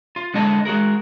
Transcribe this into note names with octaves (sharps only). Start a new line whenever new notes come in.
F4
D3 G#3 E4 D#5 A5
G#3 F#4 G#4 A#4